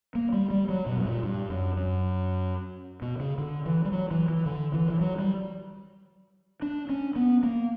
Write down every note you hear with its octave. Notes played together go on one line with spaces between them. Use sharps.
A#3
G3
G3
F#3
B2
G2
A#2
G2
F#2
F#2
B2
C#3
D3
E3
G3
F#3
E3
E3
D3
E3
E3
F#3
G3
D4
C#4
B3
A#3